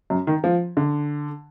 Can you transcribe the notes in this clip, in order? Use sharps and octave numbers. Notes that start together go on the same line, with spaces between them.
F#2
D#3
F3
D3